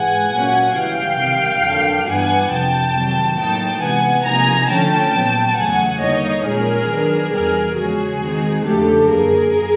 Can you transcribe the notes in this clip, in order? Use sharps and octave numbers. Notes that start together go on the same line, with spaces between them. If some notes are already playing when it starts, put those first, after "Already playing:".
Already playing: G#2 E3 G#3 F#5 G#5
A#2 F#3 A#3 C#4
C#3 E3 G3 F5 G5
C3 D#3 G3
F2 D3 F#3 A#3 D4
G2 E3 G3 B3 D4 F#5 G#5
F2 C3 F3 G5 A5
C3 D#3 F#3
A2 F#3 A#3 D#4 G5 A5
C3 E3 G#3 B3 F#5 G#5
C3 F3 A#3 D#4 G#5 A#5
D3 F3 A3 C#4 G5 A5
A#2 F#3 B3
E2 C#3 F#3 A3 F#5 G#5
D3 G3 A#3 D#4 C#5 D#5
A#2 F3 G#3 C#4 G#4 A#4
D#3 F#3 B3 D4
E2 B2 G3 G#4 A#4
E2 C#3 F3 G#3 C#4 F#4 G#4
D#3 G#3 C4 D#4
E2 C#3 F3 A3 D4 G4 A4
F#2 D3 F#3 A#3 G#4 A#4